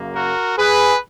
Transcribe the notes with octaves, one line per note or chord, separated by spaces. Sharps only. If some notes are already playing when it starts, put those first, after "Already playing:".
Already playing: F#2 C#3 F#3 A#3
F#4 A#4
G#4 B4